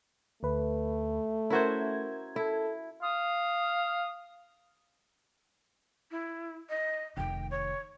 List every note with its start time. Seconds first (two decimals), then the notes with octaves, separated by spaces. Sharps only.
0.43 D2 A3 B4
1.50 C#4 E4 F#4 A#4 C5 G#6
2.36 E4 A4
3.02 F5 D#6
6.11 E4
6.69 D#5
7.17 F1 D#3 G5
7.51 C#5